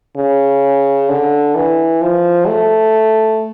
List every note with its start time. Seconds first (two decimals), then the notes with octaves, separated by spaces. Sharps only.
0.17 C#3
1.09 D3
1.55 E3
2.01 F3
2.47 A3